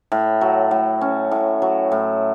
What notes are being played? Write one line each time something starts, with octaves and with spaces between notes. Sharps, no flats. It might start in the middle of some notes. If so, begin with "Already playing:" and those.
A2
F#3
A2
C#4
A2
F#3
A2